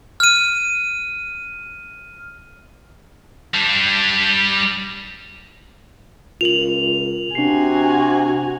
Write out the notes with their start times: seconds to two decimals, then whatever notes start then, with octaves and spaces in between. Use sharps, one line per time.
0.20 F6 D#7
3.54 G3 D4
6.41 C#2 F4 A#4 F7 F#7
7.35 C3 D4 F#4 G#5 C7